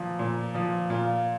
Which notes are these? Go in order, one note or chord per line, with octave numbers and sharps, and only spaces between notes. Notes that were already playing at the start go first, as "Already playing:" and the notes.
Already playing: A#2 F3
A#2
F3
A#2 F4